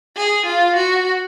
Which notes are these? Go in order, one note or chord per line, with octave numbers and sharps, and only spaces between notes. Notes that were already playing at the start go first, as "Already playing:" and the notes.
G#4
F4
F#4